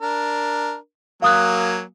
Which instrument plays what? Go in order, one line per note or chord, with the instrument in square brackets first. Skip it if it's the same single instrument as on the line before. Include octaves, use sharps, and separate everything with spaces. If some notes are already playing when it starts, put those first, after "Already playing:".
[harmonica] D4 A#4
[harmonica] F#3 A#3 G#5 [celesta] F5 D#6 F#6